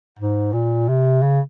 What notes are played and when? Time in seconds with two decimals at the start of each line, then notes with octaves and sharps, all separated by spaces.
0.19 G#2
0.53 A#2
0.89 C3
1.22 C#3